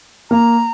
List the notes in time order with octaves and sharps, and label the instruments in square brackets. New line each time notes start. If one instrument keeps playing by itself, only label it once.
[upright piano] A#3 [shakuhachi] A#5